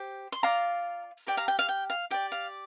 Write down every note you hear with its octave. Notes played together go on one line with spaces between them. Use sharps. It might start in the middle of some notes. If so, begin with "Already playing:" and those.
Already playing: G4 C5
C6
F4 D5 F5 A#5
G4 A#4 D5 G5
F5 A#5
G5
F5
G5
F5
G4 D5 G5
F5